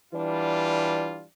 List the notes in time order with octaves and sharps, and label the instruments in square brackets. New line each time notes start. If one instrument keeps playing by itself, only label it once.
[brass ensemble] E3 G3 D4 F4